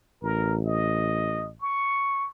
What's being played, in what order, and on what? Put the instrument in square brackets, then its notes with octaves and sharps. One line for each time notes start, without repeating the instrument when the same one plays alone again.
[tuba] A1 [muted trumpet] A#4
[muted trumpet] D#5
C#6